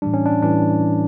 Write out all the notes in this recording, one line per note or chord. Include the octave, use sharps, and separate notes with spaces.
A2 E3 G3 D4
C#4
D4
A2 E3 G3 D4